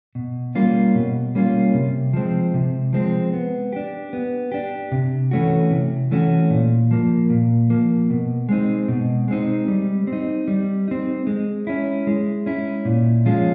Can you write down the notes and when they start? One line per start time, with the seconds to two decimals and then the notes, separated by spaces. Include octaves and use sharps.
0.15 B2
0.55 G3 A#3 C#4 F4
0.95 B2
1.35 G3 A#3 C#4 F4
1.74 C3
2.13 F3 G#3 C4
2.54 C3
2.93 F3 G#3 C4
3.33 B3
3.73 D4 G4
4.13 B3
4.52 D4 G4
4.92 C3
5.31 E3 A3 C#4 F#4
5.71 C3
6.11 E3 A3 C#4 F#4
6.50 A#2
6.91 F3 A#3
7.30 A#2
7.70 F3 A#3
8.10 B2
8.49 G#3 C4 D#4
8.88 B2
9.28 G#3 C4 D#4
9.68 G3
10.07 C4
10.13 D#4
10.48 G3
10.88 C4 D#4
11.27 G#3
11.67 C#4 E4
12.07 G#3
12.46 C#4 E4
12.85 A#2
13.26 F3 G#3 C#4 F4